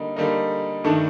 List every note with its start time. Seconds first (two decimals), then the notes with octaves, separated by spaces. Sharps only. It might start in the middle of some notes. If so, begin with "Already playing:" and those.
Already playing: D3 G3 A#3 D#4
0.16 D3 G3 A#3 D#4
0.84 G2 D#3 A3 D4